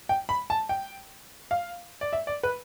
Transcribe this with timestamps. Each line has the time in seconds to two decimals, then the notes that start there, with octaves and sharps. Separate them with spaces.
0.09 G5
0.29 B5
0.50 A5
0.69 G5
1.51 F5
2.01 D5
2.13 E5
2.27 D5
2.43 B4